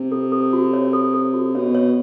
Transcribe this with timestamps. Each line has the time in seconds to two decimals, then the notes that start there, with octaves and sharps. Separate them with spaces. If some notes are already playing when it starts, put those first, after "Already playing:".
Already playing: C3
0.12 A4
0.32 A4
0.53 F#4
0.74 C#5
0.93 A4
1.14 A4
1.34 F#4
1.55 B2 C#5
1.74 C#5